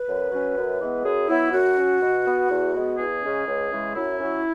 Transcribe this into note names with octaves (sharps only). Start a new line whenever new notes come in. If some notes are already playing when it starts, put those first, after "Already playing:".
Already playing: B4
F#2
F#3 C#4
F#2
E3 G#3 B3
F#2 G#4
F#3 B3 E4
F#2 F#4
F#3 C#4
B2
B3
E2
B2 G#3 B3
E2 G#4
C#3 G#3 C#4
C#2
C#3 E3 G#3
F#2 E4
F#3 C#4